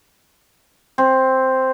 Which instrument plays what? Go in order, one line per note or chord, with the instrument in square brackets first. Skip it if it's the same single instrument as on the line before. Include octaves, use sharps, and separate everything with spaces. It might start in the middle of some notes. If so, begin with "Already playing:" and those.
[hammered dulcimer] C4